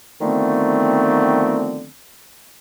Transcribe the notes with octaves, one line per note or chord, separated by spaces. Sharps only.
D3 D#3 F3 A3 B3 C4